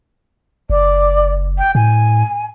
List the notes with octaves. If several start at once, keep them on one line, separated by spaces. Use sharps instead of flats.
F#1 D5
G5
A2 G#5